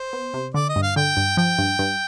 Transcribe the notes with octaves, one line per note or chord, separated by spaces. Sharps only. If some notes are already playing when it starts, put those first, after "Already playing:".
Already playing: C5
B3
C3
D3 D5
D#5
G2
F5
D3 G5
G2
F3 G5
G2
G2